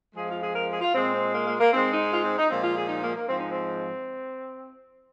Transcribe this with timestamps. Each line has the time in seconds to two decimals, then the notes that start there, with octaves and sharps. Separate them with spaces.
0.15 F2 F3 G#3 G#4
0.29 F4
0.42 G#4
0.54 A#4
0.72 G#4
0.81 F4
0.93 A#2 G#3 C4
1.14 C4
1.33 A#3
1.46 A#3
1.59 A#3
1.72 G#2 G#3 C4
1.91 D#4
2.11 F4
2.24 C4
2.37 D#4
2.50 A#2 F3 G#3 C4
2.63 F4
2.76 G#4
2.88 D#4
3.02 A#3
3.15 A#3
3.28 G#2 F3 G#3 C4
3.39 D#4
3.49 C4